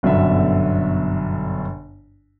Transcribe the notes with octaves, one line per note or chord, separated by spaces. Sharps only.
G1 F#2 B2 D3 E5